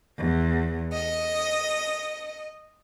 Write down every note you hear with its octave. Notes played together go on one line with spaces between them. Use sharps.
E2
D#5